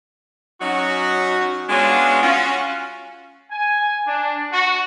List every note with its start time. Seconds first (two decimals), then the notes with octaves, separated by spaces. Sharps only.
0.61 F#3 C#4 D#4 F#4
1.69 G#3 B3 C#4 D4 F4 F#4
2.22 C#4 F4 F#4
3.51 G#5
4.06 D4
4.51 F#4